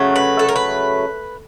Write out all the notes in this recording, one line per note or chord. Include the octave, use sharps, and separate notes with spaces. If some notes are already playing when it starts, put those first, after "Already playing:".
Already playing: C#3 F#3 A3
B4
A4
A#4
B4